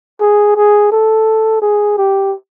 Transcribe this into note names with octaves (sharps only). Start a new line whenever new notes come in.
G#4
G#4
A4
G#4
G4